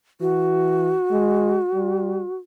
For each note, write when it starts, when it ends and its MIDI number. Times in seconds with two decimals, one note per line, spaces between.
0.21 0.94 52
0.21 2.36 66
1.11 1.58 56
1.74 2.22 55